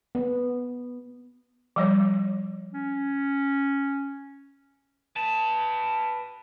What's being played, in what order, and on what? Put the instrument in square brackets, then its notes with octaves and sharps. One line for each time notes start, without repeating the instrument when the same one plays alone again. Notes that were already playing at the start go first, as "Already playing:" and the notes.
[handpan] B3
[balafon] F3 G3 C#5
[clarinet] C#4
[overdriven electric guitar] B4 A5